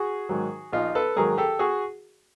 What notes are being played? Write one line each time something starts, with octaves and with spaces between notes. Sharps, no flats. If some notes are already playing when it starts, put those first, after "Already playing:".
Already playing: F#4 G#4
G#2 D#3 F#3
A#1 D#4 F4
A4 B4
G#2 D#3 F#3 G#4 A#4
G4 A4
F#4 G#4